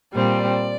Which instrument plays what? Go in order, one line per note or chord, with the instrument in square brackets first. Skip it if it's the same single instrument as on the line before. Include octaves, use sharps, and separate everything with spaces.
[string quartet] A#2 G3 C4 D5